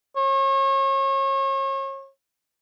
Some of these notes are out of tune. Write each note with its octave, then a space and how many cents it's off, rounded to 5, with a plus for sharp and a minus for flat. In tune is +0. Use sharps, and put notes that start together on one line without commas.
C#5 -35